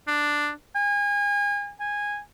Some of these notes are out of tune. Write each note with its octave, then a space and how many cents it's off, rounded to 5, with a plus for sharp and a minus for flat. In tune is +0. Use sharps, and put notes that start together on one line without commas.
D4 +5
G#5 -30
G#5 -15